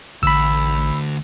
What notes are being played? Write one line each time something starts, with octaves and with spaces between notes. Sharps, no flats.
A1 D2 B5 E6